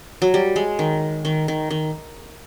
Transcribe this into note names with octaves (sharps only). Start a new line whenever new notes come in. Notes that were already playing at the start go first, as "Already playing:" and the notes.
F#3
G3
G#3
D#3
D#3
D#3
D#3